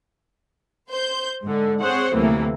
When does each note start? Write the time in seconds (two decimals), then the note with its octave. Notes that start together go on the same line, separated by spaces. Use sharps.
0.90 C5 G6
1.43 G#2 D3
1.81 C4 G#4 C5 C#5 F#5
2.14 D2 A2 C3 E3 F#3 A#3